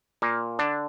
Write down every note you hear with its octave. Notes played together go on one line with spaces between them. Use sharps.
A#2 A#3
D3 D4